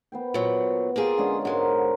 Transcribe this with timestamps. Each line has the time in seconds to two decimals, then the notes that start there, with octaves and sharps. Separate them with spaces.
0.12 B3 C5 G5
0.34 A#2 F#3
0.96 A#3 F4 G4 G#4 A#5
1.18 D3 G#3 C#4
1.45 G#2 G#3 F#4 A#4 C5